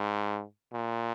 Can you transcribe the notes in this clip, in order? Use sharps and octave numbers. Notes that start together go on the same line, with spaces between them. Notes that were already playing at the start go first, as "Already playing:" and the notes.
Already playing: G#2
A#2